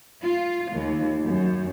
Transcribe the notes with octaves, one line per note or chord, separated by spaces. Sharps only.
F4
D#2
F#2